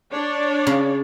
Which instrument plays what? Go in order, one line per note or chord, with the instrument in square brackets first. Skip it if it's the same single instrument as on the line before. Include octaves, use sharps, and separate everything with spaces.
[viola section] D4 C#5 D5
[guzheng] C#3